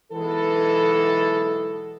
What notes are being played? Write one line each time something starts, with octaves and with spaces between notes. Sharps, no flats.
B1 E3 G#3 B3 A4